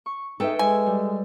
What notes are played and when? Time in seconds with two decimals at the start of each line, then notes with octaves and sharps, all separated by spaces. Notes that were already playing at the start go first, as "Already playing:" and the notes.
0.06 C#6
0.40 D#4 G#4 A4 B4 E5 G5
0.59 G#3 G#5
0.86 G3